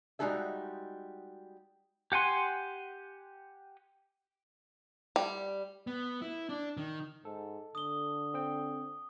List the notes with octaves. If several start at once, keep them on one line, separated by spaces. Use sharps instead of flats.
G3 G#3 D#4 F#4 A4 E5
G4 F#5 G#5 C6
G3
B3
E4
D4
D#3
G#2 A4
D3 D#6 G7
C4 G5